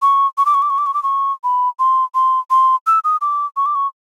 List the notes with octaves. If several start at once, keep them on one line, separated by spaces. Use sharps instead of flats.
C#6
C#6
D6
C#6
D6
C#6
D6
C#6
D6
C#6
B5
C6
C6
C6
E6
D#6
D6
C#6
D6
C#6